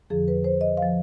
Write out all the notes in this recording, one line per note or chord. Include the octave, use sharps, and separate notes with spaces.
F2 D3 F3 G#4
B4
C5
D#5
F5
F3